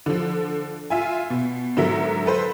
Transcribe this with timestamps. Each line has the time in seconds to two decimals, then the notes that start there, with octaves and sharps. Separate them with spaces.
0.06 D3 F3
0.90 F4 E5 G#5
1.30 B2
1.77 G#2 D3 F#3 A#4 E5
2.26 A4 B4 C5